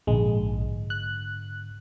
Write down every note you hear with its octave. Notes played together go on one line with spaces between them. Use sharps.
A#1 G#2 D3 G#3
F#6